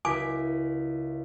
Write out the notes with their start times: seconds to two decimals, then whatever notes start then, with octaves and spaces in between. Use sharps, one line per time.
0.05 C#2 E4 F#4 A#4 G#5 D6 B6